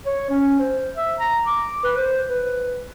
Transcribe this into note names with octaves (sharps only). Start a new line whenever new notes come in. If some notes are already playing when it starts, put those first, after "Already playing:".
C#5
C#4
C5
E5
A#5
D6
B4
C5
B4